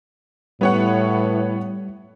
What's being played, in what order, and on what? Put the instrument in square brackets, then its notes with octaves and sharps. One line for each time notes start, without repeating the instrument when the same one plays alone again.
[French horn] A2 [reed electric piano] G3 E4 [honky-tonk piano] B3 C#5 F#5